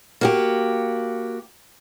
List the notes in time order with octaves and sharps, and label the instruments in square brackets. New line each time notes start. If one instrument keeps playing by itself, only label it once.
[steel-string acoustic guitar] A#3 F#4 G4